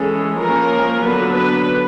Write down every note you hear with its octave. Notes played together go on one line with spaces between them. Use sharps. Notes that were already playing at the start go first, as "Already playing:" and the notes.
Already playing: E3 G#3 C#4 A4
F3 A#3 C#4 A#4
D3 F#3 B3 D4 B4
B4